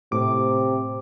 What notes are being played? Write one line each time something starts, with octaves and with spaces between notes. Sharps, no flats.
A2 C3 D6